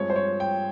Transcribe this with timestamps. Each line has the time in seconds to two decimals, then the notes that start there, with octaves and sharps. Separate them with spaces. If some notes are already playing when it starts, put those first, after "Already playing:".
Already playing: G2 F3 G#3 C4 C#5
0.10 C5
0.16 C#5
0.40 G5